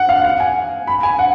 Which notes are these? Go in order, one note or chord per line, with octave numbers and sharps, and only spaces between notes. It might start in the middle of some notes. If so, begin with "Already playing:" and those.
Already playing: F#5
F5
F#5
G#5
B5
G#5
F#5